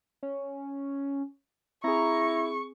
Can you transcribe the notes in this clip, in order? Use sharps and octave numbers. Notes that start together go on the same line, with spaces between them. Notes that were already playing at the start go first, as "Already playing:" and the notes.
C#4
C4 E4 G#4 A#5 C#6